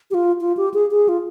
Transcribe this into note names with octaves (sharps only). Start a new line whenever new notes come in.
G4
F4
F4
G4
G#4
G#4
F4